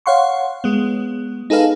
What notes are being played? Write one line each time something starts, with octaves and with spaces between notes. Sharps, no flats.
C#5 F5 F#5 C6 C#6
G#3 B3
D#4 G#4 A4 B4 F5